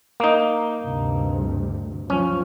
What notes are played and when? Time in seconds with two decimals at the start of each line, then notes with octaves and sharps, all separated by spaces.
0.20 A#3 D#4
0.80 D2 G2 C3
2.10 F3 C#4